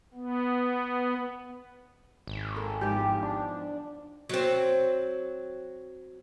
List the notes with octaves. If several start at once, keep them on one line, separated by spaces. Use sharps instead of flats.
B3
G#1
A#3 A4
E2 G#2 F3 G4
D4
F#3 C4